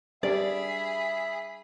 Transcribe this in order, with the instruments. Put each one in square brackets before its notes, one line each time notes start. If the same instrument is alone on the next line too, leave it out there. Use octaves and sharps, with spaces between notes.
[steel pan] G3 D4 G4 [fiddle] G#4 B5 [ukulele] D5 [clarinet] E5